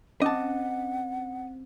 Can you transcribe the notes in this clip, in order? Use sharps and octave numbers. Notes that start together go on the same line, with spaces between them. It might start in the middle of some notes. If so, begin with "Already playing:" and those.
C4 C#4 D#5 F#5 A5 D6